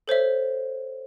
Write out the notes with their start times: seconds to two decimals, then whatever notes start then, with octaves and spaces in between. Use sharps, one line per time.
0.08 A4 C5 C#5 E5